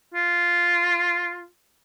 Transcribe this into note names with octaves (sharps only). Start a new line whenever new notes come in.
F4